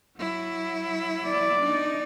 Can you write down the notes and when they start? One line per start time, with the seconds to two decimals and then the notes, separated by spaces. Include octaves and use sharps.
0.17 F#3 E4
1.27 D5
1.61 D4 D#4